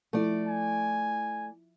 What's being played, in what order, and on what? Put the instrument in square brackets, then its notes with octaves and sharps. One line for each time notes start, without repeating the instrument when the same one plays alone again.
[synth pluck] F3 E4 [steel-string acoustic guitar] A3 D5
[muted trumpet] G#5